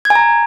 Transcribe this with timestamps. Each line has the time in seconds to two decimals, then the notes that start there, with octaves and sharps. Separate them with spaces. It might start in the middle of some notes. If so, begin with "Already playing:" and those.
0.05 G#6
0.10 G#5
0.15 A#5